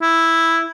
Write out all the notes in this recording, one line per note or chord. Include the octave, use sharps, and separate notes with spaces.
E4